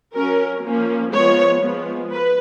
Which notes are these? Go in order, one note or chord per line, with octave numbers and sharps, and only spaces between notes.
F#3 C#4 A#4
F3 A#3 C#4
F3 G#3 B3 C#5
F3 G#3 B3
B4